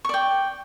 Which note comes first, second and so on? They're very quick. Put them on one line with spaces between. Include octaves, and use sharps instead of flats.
C#6 D5 G5